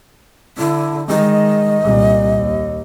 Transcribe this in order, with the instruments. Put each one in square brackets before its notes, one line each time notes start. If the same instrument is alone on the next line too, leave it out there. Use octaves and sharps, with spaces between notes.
[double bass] D3 [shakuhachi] E4
[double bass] D#3 G#3 [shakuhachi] D#5
[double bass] C2 A#2
D#2